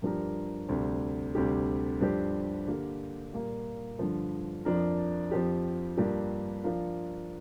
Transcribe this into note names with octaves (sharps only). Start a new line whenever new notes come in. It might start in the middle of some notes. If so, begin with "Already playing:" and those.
G2 F3 D4 G4 A#4
D2 C3 G3
D2 C3 G3 D4 G4
G2 F3 D4 G4 C5
D3 A#3 G4 A#4
A#2 G3 A#3 F4 A#4
G2 D3 F3
F2 F3 D4 A#4
F2 F3 C4 G4
G2 F3 A#3 D4 G4
F3 D4 F4 A#4